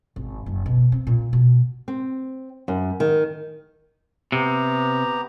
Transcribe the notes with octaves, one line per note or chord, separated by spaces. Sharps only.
G#1
F#1
B2
C4
A#2
B2
C4
F#2
D#3
C3 B3 G4 A#5